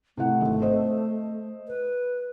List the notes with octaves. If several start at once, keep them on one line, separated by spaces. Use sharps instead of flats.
C3 A3 E4 F#5
G#1
C5 D#5
B4